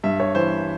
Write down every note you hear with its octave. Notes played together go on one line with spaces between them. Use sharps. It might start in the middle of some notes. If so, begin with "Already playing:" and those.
G2 E5
C#5
E3 C5